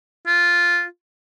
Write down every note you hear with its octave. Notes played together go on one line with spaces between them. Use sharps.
F4